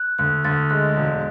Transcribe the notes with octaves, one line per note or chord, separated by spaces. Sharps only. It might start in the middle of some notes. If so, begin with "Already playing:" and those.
Already playing: F#6
D2 F#6
D2 A6
G#3 F#6
E1